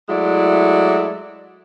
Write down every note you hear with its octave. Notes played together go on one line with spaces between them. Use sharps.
F#3 G#3 A3 E4 D5